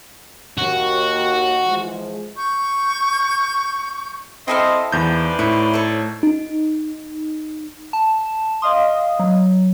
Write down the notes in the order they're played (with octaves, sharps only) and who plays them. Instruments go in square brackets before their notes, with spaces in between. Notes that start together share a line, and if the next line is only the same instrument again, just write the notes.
[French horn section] D#2 [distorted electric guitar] F#4
[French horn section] E3 F3 G#3
[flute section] C#6 G6
[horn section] C4 [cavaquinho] E4 A4 F5 [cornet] D#5
[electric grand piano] E2 G6 [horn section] D#4 C5 D5 [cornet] B4
[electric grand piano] A2 [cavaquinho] E4 C#6
[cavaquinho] A4 C#5
[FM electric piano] D#4
[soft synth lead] A5
[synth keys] D#5 F5 D#6 [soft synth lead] C6
[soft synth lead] F#3